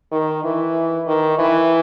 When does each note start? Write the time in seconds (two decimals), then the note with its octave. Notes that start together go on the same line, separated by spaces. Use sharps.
0.12 D#3
0.44 E3
1.07 D#3
1.39 E3